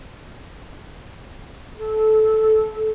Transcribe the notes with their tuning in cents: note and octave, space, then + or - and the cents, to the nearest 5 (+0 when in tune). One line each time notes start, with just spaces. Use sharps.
A4 -15